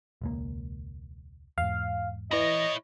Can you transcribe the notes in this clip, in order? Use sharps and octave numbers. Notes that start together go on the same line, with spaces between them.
E1 C#2 A#3
E2 G#2 F5
E3 E4 C#5 D#5 A#6